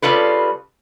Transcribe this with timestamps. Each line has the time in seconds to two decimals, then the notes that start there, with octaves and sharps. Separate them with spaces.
0.02 C#3 G3 F4 A4 B4